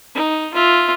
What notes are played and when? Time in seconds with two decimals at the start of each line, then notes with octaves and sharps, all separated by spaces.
0.15 D#4
0.54 F4 E5